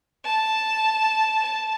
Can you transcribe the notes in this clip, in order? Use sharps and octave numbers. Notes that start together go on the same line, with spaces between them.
A5
A5